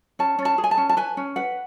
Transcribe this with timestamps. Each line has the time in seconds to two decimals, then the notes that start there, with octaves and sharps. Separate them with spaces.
0.19 C#4 A5
0.39 C#4
0.45 A5
0.58 G#4
0.64 G#5
0.71 A5
0.77 C#4
0.89 A5
0.97 B4 G#5
1.17 C#4
1.36 B4 F#5